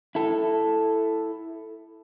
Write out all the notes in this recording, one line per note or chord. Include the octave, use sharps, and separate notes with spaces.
E4 A4